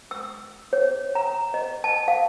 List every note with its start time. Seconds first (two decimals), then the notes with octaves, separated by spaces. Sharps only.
0.11 E6
0.73 C#5
1.15 A#5
1.54 D#5
1.84 A5
2.08 F5